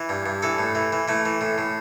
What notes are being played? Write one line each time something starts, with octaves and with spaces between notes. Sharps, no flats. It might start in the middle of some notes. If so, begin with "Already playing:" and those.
Already playing: E3
G2
G2
E3 A4
A2
E3
E3
E3 A3
E3
A2
A2